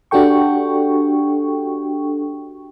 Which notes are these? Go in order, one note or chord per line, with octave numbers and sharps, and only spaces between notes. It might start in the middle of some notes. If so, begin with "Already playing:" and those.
D4 F#4 G4 A4 G5 C#6